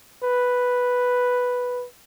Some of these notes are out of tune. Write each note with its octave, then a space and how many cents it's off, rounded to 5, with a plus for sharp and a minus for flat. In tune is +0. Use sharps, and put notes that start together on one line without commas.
B4 +0